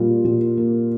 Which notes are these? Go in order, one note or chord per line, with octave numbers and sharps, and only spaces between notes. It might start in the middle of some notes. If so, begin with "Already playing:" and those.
Already playing: A#2 G3 F4
A#2
A#3